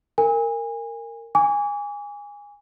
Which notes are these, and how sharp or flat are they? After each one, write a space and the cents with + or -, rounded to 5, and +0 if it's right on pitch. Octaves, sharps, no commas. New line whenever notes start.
A#4 -15 G#5 -30
G#5 -20 D6 -40